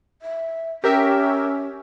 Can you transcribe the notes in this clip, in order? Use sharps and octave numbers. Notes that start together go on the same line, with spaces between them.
E5
C#4 G4 A#4 E5